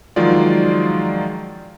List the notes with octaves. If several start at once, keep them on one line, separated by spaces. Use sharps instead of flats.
D#3 F3 F#3 G#3 F4 D5